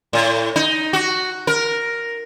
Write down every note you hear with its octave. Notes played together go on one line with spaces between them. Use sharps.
A2
D#4
F#4
A#4